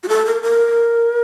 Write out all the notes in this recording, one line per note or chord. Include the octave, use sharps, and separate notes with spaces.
F#4
A4
A#4
A#4